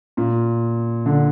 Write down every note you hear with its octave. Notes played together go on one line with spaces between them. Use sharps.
A#2
D3